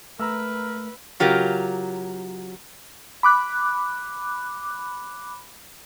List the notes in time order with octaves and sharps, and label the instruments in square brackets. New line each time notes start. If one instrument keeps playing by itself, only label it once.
[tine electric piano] A3 [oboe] A#4 [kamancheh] B4 [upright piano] A#5 E6
[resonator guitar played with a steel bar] C#3 F#3 F4 G4 A#4
[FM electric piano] B5 D6 F#6